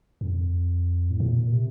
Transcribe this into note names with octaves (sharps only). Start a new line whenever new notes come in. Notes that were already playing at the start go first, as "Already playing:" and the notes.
F2
A2
A#2
C3